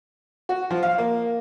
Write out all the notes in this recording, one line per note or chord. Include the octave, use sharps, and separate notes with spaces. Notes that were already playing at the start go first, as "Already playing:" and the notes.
F#4
F3
F5
A#3